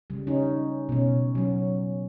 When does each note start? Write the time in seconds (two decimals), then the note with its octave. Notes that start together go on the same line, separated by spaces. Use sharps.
0.10 C#3 G3
0.27 C#4 D#4
0.89 B2 C#4
1.35 F#3 C#4